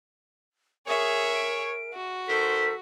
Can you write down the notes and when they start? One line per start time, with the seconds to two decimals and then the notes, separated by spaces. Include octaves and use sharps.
0.87 G#4 A#4 C#5 E5 D#6
1.34 D7
1.94 F#4
2.28 D#3 A4 C5 B6